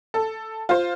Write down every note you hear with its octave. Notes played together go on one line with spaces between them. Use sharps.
A4
F4 C5